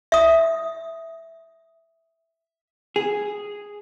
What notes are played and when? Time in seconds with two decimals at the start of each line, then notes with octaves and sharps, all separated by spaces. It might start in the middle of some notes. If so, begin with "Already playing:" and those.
0.12 E5 D#6
2.96 G#4